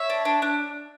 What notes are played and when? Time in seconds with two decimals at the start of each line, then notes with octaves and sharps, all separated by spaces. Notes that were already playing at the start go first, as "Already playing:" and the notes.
Already playing: C#5 E5
0.10 D4
0.25 D4
0.42 D4